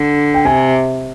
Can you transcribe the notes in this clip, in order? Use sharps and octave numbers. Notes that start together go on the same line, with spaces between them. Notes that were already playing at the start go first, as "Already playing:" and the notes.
Already playing: D3
G5
C3 G#5